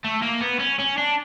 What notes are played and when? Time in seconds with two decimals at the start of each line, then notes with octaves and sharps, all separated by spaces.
0.04 A3
0.22 A#3
0.41 B3
0.60 C#4
0.79 C#4
0.97 D4